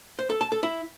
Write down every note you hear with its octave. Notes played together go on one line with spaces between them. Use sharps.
C5
A4
A5
A4
E4